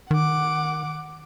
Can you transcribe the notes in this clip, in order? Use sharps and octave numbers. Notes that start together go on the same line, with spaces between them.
D#3 F#5 D6